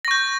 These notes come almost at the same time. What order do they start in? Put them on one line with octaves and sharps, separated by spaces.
A#6 C#6 G6